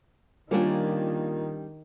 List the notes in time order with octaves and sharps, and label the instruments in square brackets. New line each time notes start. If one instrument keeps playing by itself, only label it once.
[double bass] D#3 [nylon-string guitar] G3 C#4 D4 [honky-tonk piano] A#3 F4